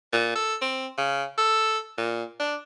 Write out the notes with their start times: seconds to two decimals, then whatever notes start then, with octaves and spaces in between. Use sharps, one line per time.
0.13 A#2
0.36 A4
0.62 C4
0.98 C#3
1.38 A4
1.98 A#2
2.40 D4